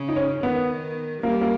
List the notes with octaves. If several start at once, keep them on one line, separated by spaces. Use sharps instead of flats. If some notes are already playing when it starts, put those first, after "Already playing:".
Already playing: C#3
D#4
C#4
D#3 B3
G3 A#3
A#3